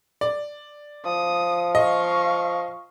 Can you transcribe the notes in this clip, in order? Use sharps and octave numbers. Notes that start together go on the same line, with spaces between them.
D5
F3 D#6
D#5 F5 C#6